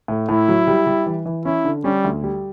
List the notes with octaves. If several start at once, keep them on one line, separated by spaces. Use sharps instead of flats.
A2
A2 E4
F#3
G3
G3
E3
E3
C#4 E4
D3
G3 C#4
D2
G3